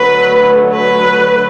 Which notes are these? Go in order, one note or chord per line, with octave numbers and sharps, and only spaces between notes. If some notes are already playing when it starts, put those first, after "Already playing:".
Already playing: D3 F#3 A3 B4
B4